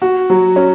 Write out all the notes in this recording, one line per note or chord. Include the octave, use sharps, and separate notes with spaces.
F#4
F#3
C#4